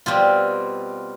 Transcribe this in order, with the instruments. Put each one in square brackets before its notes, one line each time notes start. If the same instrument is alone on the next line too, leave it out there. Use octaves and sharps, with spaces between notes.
[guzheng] B2 G3 C4 F4